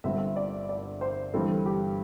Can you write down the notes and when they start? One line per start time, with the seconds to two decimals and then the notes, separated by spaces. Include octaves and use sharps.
0.04 G1 G2 D3 G3 C4 E5
0.18 E5
0.36 D5
0.69 D5
1.01 C5
1.33 G1 G2 E3 G3 C4 A4
1.66 G4